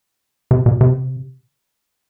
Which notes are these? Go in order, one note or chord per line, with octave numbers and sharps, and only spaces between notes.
C3
B2
C3